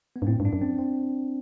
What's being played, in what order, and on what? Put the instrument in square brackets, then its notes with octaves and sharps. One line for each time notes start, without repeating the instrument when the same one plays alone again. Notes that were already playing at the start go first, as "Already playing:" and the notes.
[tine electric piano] B3
[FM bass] G2
[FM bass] A2 [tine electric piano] C4
[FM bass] G2
[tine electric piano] D4
[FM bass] F#2
[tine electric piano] C4
C4